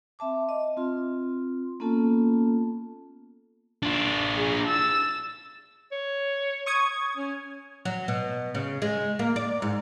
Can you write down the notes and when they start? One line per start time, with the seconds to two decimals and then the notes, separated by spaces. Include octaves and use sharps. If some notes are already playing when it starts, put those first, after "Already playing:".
0.19 C4 E5 A5 D6
0.49 D#5
0.77 C4 F4 C6
1.80 A#3 B3 C#4 F4 A4 A5
3.83 D4 F4
4.36 G#4
4.66 E6 A6
5.92 C#5
6.66 C#6 D#6 G#6
7.17 C#4
7.85 F#3
8.08 B2
8.55 C#3
8.82 G#3
9.19 A#3
9.36 D5
9.62 G#2